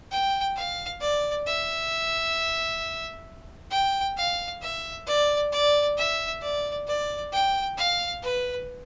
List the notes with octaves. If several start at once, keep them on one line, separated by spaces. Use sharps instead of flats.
G5
F5
D5
E5
G5
F5
E5
D5
D5
E5
D5
D5
G5
F5
B4